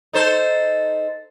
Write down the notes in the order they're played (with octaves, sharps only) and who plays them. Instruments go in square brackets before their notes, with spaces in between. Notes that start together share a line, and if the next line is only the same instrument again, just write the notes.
[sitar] D#4 A4 C5